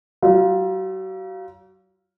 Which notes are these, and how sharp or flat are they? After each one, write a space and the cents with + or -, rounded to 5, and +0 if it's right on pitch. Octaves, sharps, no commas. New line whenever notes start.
F#3 +40 F4 +0